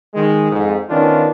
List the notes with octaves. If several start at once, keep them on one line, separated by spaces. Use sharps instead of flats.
D#3 G#3
F2 G#2
D#3 B3 C#4 D4 F4